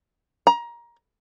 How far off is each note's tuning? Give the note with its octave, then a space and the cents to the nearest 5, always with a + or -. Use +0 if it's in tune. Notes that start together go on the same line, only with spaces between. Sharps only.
A#5 +20